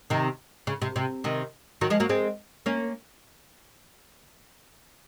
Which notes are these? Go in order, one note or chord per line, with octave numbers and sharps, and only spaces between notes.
C3 D#3
C#3
C3
C3
C3 D#3
D#3 F#3
F3 G#3
F#3 A#3
G#3 C4
A#3 C#4